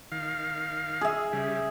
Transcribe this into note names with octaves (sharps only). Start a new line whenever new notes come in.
D#3 F5
G#4 E5
C#3 G3